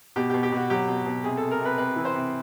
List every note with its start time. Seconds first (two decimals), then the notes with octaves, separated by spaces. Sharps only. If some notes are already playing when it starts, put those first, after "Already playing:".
0.16 B2 G4
0.30 B2 G4
0.43 G4
0.52 B2 F#4
0.70 F#3 G4
0.88 B2
1.06 B2
1.24 C3 G#4
1.37 A4
1.42 C3
1.51 A#4
1.60 C3 B4
1.78 C3 B4
1.96 E3
2.05 C5
2.14 C3